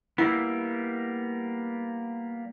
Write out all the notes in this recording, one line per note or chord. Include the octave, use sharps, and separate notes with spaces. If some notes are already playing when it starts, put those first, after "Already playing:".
G3 A#3 B3 E4 C7